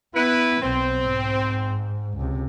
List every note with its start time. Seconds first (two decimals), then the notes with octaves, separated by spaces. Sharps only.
0.15 B3 E4 B4
0.62 B1 C4
1.01 G#2
2.17 C#2 C3